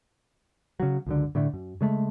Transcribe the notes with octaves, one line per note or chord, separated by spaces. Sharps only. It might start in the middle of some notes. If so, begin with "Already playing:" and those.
C#3 F#3
C#2 F#2 D3
A2 D3 A3
F#2
C#3 G#3 A3